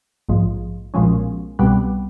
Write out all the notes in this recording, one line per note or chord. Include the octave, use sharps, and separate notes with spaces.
A#1 G#2 F3
B1 A#2 F3 G#3 C#4
C2 B2 G3 B3